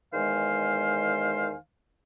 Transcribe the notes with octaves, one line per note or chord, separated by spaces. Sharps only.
E2 D#3 G#3 C5 F5 G#5